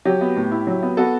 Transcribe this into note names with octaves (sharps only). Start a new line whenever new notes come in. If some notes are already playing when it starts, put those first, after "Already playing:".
F#3 G4
B3
A2
E4
F#3
B3
B3 F#4 A4